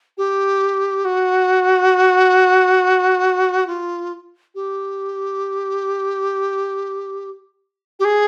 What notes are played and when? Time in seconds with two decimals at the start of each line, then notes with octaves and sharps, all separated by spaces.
0.18 G4
1.05 F#4
3.67 F4
4.55 G4
8.00 G4
8.05 G#4